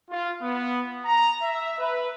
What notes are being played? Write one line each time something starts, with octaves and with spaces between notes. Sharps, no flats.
F4
B3
A#5
E5
B4